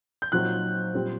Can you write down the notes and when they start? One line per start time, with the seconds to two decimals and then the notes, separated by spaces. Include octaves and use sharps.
0.22 G6
0.32 A#2 F#3 C4 D#4 F#6
0.94 A#2 G3 C4